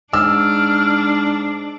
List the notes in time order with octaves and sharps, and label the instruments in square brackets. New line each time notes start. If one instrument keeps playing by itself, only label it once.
[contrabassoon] G#2 [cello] D4 [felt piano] E6 [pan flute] F6